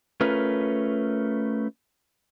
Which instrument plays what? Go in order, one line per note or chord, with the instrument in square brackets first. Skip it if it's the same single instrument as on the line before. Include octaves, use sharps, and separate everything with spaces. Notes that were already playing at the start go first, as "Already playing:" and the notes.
[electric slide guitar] A3 C#4 F4 A#4 B4